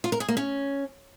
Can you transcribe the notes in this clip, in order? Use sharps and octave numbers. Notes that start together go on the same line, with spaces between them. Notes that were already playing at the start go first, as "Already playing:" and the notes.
F4
A#4
G#4
A#3
C#4